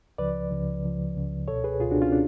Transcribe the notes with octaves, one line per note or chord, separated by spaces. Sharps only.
C#2 C#3 F3 B4 D5
C#2 C#3 F3
C#2 C#3 F3
C#2 C#3 F3
C#2 B2 A4 C#5
G#4 B4
C#2 B2 F4 G#4
D4 F#4
C#4 F4
D4